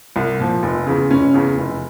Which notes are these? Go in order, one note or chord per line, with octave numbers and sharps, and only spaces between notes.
C2
A#2 F3
F1
E2 C#3
F1 C#4
E2 C#3
F1